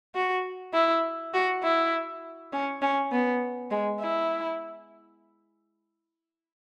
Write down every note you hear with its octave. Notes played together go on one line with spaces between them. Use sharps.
F#4
E4
F#4
E4
C#4
C#4
B3
G#3
E4